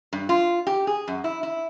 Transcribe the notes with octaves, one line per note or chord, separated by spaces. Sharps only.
G2
F4
G4
G#4
F#2
E4
E4